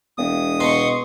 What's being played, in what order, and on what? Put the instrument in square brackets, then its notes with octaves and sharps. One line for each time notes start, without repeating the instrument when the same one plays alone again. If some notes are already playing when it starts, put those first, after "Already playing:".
[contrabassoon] E1 [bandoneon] D#6
[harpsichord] B2 D#4 [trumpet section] C6 C#6